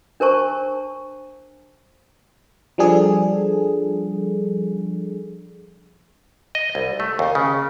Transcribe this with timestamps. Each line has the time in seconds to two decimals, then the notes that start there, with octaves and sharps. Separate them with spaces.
0.20 D4 A#4 C5 A5 C#6
2.78 F3 G3 D4 G#4 A4
6.55 D#5
6.75 C2
7.00 A3
7.19 D#2
7.35 C#3